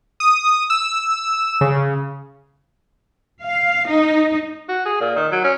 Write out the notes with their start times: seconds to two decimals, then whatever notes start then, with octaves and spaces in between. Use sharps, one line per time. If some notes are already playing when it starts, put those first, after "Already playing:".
0.20 D#6
0.70 E6
1.61 C#3
3.44 F5
3.89 D#4
4.69 F#4
4.85 G#4
5.01 A#2
5.16 D#3
5.32 F#3
5.44 C#4